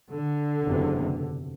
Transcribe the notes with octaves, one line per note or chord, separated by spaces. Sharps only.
D3
F#1 E2 C3